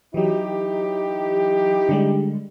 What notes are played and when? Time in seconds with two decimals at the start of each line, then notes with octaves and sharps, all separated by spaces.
0.14 E3 F#3 D#4 E4 G4
1.89 D3 G3 G#3